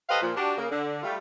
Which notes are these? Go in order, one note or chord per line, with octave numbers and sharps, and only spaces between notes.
G4 A4 B4 C5 D#5 F5
A#2 F3
D4 F#4 G4
C#3 A#3
D3
G3 A3 F4